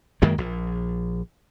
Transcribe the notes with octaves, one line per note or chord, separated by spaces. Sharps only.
F#2 D#3 G#3 A#3
A#1